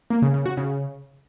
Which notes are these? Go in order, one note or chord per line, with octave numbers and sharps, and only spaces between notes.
A#3
C#3
C#3
F#4
C#3